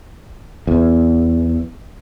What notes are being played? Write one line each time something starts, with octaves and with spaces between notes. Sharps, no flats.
E2